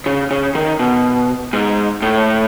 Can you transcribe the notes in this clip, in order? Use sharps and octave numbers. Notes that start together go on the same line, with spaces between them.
C#3
C#3
D#3
B2
G#2
A2